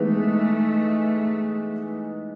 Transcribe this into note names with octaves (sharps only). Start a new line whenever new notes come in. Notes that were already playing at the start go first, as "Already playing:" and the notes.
Already playing: E3 G#3 A3 B3 D#4